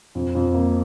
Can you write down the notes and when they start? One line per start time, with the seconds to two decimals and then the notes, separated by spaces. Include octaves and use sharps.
0.15 F2
0.35 F2
0.54 A#3